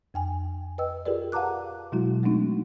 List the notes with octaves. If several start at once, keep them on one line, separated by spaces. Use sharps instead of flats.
F2 G5 G#5
B4 D#5 G5 E6
F4 G4 G#4 A#4 B4 D5
F5 F#5 A5 A#5 D6 F#6
B2 F#3 G#3 E4 F#4
G#3 A3 C4 D4 D#4